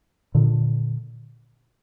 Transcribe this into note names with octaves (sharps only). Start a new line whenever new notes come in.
A#2 D3